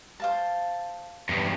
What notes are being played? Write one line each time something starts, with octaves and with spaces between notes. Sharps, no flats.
C5 F5 A5
E2 G2